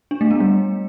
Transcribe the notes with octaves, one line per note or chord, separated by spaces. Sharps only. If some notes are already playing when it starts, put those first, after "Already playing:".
D4
A3
B3
G3